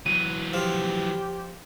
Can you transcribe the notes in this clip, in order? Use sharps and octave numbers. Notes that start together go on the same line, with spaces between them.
E3 F#3 D#7
F3 G4